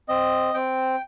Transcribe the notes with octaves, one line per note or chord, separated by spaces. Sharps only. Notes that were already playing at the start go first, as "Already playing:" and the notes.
C4 D#5
C4 G5